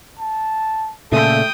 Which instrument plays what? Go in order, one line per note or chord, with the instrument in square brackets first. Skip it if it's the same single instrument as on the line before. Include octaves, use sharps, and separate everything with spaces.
[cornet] A5
[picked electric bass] A#2 C#3 [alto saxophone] A3 [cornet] A4 [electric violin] G5 D#6